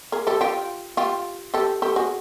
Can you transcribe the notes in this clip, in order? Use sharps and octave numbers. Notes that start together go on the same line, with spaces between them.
G#4 A#4
G4 A4
F4 G4
F4 G4
G4 A4
G4 A4
F#4 G#4